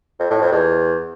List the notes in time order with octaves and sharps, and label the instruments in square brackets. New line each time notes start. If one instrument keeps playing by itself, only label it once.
[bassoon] F2
A2
F2
E2